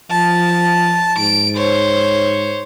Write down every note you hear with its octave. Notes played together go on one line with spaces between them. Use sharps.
F3 A5
G#2 D7
C5 C#5